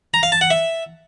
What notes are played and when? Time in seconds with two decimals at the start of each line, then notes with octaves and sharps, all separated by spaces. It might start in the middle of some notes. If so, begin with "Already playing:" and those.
0.14 A#5
0.23 F5
0.32 A5
0.41 F#5
0.50 E5